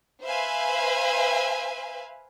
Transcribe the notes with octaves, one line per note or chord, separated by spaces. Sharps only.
B4 C5 E5 F5 G#5